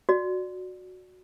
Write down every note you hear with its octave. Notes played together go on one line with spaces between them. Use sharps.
F#4 D5